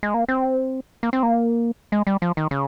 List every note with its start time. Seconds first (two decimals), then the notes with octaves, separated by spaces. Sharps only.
0.03 G#3
0.14 A#3
0.28 C4
1.03 A#3
1.13 C4
1.23 A#3
1.92 G#3
2.07 G3
2.22 F3
2.37 D#3
2.51 C#3